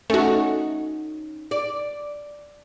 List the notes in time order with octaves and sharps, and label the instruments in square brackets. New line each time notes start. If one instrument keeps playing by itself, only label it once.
[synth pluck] A3 F#4 [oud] C#4 D#4
[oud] D5